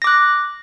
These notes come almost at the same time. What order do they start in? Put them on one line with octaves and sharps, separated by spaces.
A#6 D6 F#6